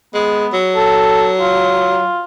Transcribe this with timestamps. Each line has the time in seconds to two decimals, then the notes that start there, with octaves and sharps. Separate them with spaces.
0.14 G#3 B3
0.53 F#3
0.76 A4
1.40 F4